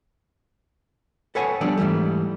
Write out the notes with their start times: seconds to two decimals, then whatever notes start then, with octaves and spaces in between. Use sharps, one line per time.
1.35 A4 B4 C#5 F#5 G#5
1.61 F3 G3 B3 D4 A4 D5
1.78 G#2 E3 F3 G3 A3